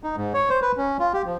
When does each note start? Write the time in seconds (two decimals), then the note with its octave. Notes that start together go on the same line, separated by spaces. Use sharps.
0.03 D#4
0.16 G#2
0.34 C#5
0.50 C5
0.62 B4
0.77 C#4
1.00 F4
1.13 G4
1.26 F3